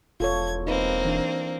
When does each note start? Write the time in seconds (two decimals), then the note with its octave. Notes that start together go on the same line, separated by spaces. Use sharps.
0.20 E1 F4 A4 C#5 G#6
0.67 A#3 C4 D#4 B4
1.05 E3 D4